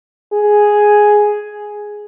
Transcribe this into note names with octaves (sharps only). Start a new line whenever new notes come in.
G#4